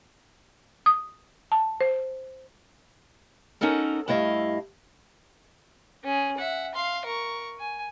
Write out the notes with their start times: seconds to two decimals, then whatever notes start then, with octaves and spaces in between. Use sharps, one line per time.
0.86 D#6
1.52 A5
1.81 C5
3.61 C#4 D#4 F#4 A4 A#4
4.08 G2 A3 E4 D#5 F5
6.04 C#4 G#4
6.37 E5 F#5
6.75 F5 C6
7.05 A#4 C#6
7.59 G#5